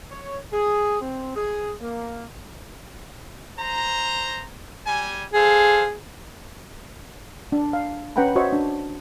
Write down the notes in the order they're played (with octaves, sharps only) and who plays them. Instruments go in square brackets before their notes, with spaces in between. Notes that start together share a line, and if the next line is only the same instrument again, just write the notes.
[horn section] C#5
G#4
C4
G#4
A#3
[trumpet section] C5 A#5
G3 G#5
[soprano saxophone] G#4 [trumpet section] A4 C5 F5
[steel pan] D4
F5
C#4 B4 F#5 G5 A#5 B5
F#4 C5 C#5 D#5 E5 C#6
D4